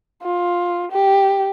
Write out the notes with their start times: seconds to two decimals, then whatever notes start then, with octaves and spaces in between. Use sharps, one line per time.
0.23 F4
0.92 G4